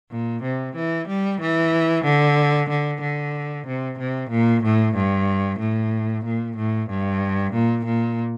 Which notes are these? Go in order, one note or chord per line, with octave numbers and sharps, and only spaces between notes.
A#2
C3
E3
G3
E3
D3
D3
D3
C3
C3
A#2
A2
G2
A2
A#2
A2
G2
A#2
A#2